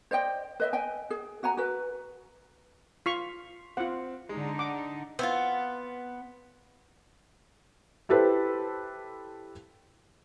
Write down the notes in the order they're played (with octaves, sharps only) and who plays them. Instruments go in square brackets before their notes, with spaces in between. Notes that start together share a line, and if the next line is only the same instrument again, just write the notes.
[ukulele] C5 D5 D#5 G5
B4 D#5 E5
D#5 G5 G#5
G#4
F#4 F#5 G#5 A#5
F#4 B4
[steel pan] F4 C#6 [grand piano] B6 C7 F7
[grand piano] C4 [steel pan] F4 F#5
[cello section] D3 D#4 [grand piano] G#3
[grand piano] F#5 [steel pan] D6
[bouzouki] B3 [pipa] C4 E4 F4
[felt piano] E4 G4 A4 B4 C5